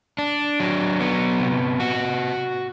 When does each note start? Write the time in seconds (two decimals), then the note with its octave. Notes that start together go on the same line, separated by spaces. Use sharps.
0.18 D4
0.60 F#3
1.00 B3
1.40 C3
1.80 F#4